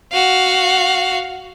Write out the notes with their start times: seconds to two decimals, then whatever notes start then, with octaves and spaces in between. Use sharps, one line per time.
0.12 F#4 F5